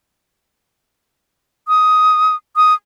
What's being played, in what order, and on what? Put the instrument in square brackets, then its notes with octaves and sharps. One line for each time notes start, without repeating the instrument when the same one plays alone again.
[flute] D#6
D#6